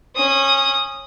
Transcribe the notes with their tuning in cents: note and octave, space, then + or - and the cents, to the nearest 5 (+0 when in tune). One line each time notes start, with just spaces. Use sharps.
C#4 -20 D#6 -5